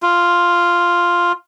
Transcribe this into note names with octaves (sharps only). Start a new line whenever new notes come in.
F4